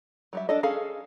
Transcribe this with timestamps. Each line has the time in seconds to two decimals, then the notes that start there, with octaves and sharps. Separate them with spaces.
0.33 F#3 G3 E5
0.49 D4 A4 D#5
0.63 C#4 G#4 A4 F5